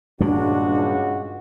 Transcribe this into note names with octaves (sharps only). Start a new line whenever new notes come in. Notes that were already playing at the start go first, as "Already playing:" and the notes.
C#2 G2 A#2 D#3 D4 F#4